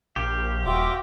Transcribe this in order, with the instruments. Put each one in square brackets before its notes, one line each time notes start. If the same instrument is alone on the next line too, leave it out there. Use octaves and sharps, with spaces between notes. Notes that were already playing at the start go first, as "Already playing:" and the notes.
[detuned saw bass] A#1 [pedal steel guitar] G4 [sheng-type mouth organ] F5
[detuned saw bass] D#1 [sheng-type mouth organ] F4 E5 D6 [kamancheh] F#4 G5